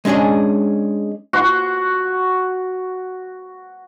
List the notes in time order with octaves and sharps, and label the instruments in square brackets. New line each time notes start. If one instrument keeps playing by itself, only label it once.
[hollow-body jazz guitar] G#3 C#4 D4 G#4 D#5
[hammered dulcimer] F#4 F#5 C6